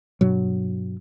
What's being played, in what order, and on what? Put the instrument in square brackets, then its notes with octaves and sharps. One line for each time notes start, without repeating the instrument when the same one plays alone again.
[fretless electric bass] G2 B2 F#3